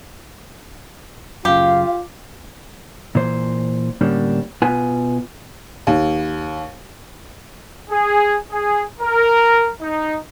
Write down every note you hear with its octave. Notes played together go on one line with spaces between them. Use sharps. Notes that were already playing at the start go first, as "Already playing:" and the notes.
F#2 C#3 F4 G4 F5
A#2 E3 C5
A2 D3 G3 A#3 C#4 D4
B2 F4 B4 G#5
D#2
G#4
G#4
A#4
D#4